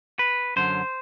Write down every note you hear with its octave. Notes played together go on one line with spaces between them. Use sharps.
B4
F#2 D3 F#3 C5